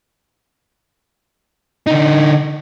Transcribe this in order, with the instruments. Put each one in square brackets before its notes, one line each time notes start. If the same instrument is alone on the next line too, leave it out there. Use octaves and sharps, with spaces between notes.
[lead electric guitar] D3 D#4